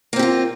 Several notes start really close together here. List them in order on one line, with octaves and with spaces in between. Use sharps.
A#3 C4 G4 F4